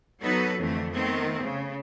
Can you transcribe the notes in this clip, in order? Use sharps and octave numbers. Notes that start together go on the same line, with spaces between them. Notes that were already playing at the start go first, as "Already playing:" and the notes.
F#3 B3 D#4 F#4 A4 B4
F2 D3 E3 A3
D#3 A3 B3 C4
C#3